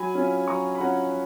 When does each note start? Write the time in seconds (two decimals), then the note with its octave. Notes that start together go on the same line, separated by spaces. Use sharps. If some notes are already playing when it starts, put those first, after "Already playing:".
Already playing: F#3 G#5 B5
0.15 C#4 F4
0.48 F#3 A#5 C#6
0.75 B5
0.80 C#4 F4 F#5 A#5